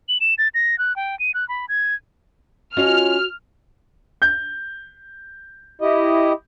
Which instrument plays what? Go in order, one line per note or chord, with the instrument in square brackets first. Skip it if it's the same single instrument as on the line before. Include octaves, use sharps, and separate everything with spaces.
[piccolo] F#7
E7
A6
A#6
F#6
G5
D#7
F#6
B5
G#6
[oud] C#4 F4 D#5 [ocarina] F#4 [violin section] F6
[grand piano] G6
[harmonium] E4 G4 D#5